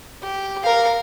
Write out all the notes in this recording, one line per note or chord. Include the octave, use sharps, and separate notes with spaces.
G4
A#4 F5